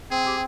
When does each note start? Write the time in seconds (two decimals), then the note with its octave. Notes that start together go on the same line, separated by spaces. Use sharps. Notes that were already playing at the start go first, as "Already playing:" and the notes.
0.11 C4 G#4
0.26 G4